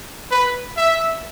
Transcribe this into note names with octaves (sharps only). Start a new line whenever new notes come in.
B4
E5